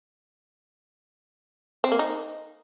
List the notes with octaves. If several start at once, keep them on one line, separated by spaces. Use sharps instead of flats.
C4
A#3
D#4